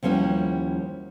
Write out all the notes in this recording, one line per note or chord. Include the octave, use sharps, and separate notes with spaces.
D#2 F3 G3 C#4 E4 F#4